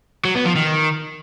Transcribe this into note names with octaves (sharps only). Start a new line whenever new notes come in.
F#3
B3
F3
D#3